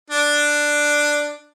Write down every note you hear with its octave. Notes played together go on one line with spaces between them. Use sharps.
D4